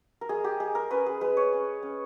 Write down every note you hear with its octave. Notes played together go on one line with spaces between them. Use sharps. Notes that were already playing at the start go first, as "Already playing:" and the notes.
A#4
G#3 G#4
G4
G#3 G#4
A#4
C#4 B4
G#4
G#3 B4
C#5
C#4
C#4